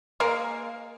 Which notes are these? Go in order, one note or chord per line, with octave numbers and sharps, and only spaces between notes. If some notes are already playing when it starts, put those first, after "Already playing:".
G#3 A#3 A#4 F5